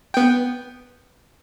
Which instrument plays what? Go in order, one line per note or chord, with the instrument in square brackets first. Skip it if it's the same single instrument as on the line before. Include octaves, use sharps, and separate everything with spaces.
[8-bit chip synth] B3 G5